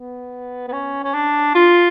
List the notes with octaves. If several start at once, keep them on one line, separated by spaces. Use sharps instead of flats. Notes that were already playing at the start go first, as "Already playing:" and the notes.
Already playing: B3
B3
C#4
C#4
D4
F4